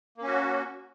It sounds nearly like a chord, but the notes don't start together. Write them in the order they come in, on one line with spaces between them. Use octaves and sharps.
A#3 C#4 F#4